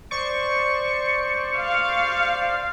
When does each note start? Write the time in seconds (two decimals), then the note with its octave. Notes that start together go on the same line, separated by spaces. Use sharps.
0.11 C5 D5 C#6
1.56 F5